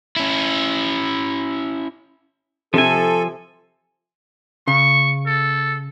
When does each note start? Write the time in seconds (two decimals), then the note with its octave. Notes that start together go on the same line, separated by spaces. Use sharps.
0.16 C#4 E4
2.74 C3 F3 A4 G#5
4.67 C#3 C#6
5.26 A4